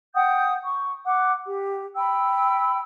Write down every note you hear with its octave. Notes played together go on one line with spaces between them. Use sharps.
F#5 G5 D#6 G6
C#6
F#5 D6 F#6
G4
G5 B5 E6